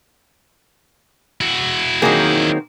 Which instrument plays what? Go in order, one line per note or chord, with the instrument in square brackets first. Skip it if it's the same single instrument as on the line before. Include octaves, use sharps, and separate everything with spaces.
[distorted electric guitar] E4 F#4
[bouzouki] D#3 C4 [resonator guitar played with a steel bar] F#3 A#3 G#4